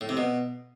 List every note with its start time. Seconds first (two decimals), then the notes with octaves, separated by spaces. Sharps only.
0.01 A2
0.09 C3
0.17 B2